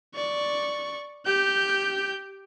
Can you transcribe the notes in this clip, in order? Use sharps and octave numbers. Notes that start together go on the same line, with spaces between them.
D5 C#6
G4 G6